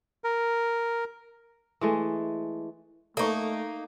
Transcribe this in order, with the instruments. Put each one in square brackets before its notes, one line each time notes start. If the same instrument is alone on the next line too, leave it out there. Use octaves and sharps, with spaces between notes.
[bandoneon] A#4
[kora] E3 G#3 A3
[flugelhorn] A3 [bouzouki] A#3 D#4 [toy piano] A4 C#6